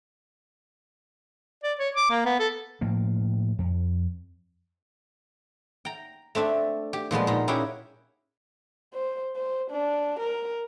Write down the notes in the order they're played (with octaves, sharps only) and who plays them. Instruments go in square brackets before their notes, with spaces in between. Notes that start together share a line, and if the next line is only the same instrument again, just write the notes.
[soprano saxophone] D5
C#5
D6
A#3
B3
A4
[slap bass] A2 F3 A#3
F2
[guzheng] G5 A#5
A3 C4 D4 E5
G4
A#2 F3 G#3 B3
A#2 D#4
C#4 E4 G4 G#4 F#5 G5
[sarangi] C5
C5
D4
A#4